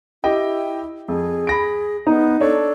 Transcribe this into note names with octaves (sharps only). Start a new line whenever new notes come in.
E4 G4 D#5 G5
F2 G#4
B5 A#6 D7
B3 D#4
D4 A4 C#5